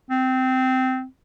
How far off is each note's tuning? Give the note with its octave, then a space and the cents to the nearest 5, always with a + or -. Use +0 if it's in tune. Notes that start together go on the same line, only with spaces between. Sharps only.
C4 -15